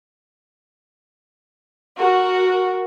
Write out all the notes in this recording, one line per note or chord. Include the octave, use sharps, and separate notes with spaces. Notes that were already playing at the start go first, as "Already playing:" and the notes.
F#4 A#4